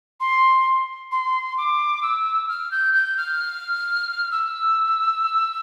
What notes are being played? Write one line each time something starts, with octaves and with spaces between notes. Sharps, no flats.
C6
C6
D6
E6
F6
G6
G6
F6
E6